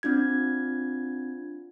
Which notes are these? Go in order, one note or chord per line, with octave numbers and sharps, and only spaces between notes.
C4 D4 F4 G#6